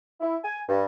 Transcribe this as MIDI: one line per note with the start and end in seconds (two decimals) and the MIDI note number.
0.21 0.37 64
0.44 0.61 80
0.69 0.85 43